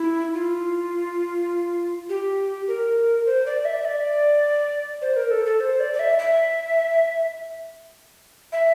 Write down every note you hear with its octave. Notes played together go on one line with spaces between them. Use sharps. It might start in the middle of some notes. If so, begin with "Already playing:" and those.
Already playing: E4
F4
G4
A#4
C5
D5
E5
D5
C5
A#4
A4
A4
C5
D5
D5
E5
E5
E5